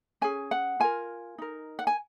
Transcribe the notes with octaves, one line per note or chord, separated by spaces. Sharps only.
C#4 G#4 G#5
F#5
F4 A#4 G#5
D#4 A#4
F#5
G#5